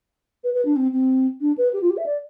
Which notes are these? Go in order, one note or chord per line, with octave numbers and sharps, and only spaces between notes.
B4
B4
D4
C4
C4
D4
B4
G4
F4
G4
E5
D5